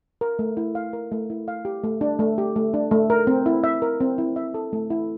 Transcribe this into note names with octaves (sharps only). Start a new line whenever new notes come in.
A#4
A3
E4
F5
A#4
A3
E4
F5
G4
A3
D4
A3
G4
A3
D4
A3
A#4
C4
E4
E5
A#4
C4
E4
E5
A4
A3
E4